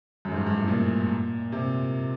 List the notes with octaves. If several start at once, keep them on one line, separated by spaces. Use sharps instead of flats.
F#2
G#2
G2
G2
A2
A#2
C3